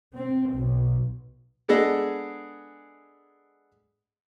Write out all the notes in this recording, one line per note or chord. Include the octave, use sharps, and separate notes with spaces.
C4
B1
G#3 B3 D4 G#4 A4 D#5